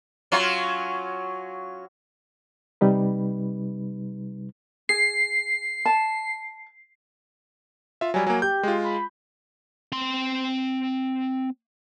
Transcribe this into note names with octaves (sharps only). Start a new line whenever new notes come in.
F#3 C#4 F4
C3 G3 D#4 B4
G#4 C7
A5
F4 E5
F#3 G3 G#5
F#3 A#3 G#5
G4 G6
G#3 F4
B5
C4 C6